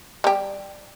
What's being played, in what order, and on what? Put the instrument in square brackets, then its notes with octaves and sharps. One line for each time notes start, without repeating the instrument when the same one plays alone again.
[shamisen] G3 G4